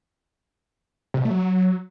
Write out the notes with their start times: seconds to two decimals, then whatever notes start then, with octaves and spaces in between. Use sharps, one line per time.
1.14 C3
1.20 B2
1.25 A3
1.30 F#3